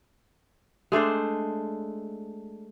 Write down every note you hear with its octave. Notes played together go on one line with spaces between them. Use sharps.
G#3 A3 D4 C5